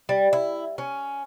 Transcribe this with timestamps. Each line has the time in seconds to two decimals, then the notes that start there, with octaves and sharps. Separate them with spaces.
0.09 G3
0.33 E4
0.78 C#4